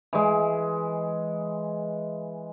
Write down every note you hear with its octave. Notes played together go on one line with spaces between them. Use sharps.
E3 G#3